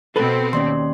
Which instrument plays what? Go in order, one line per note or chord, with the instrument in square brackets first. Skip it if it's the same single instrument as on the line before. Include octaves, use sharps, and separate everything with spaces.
[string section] B2 C4 [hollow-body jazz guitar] A4 B4
[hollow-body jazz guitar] D#2 [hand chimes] C#4 D5 C6